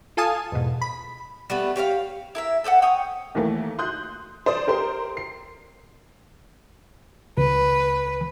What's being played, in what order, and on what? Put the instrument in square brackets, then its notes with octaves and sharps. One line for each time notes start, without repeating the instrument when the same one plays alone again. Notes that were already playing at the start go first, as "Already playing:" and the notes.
[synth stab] F4 A4 F5 G#5 A5 D#6
E2 G#2 B2
B5
[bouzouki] G3 A3 B3
G4 C#5 D5 F5
[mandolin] E4 A#4 E5
A4 C5 D5 F#5
C#5 G5 D#6
[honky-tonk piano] D#2 E3 A3 A#3
C6 D#6 F#6 G6
C5 D5 D#6
G4 A#4 C5 C6
C7
[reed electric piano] C#2 [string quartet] B4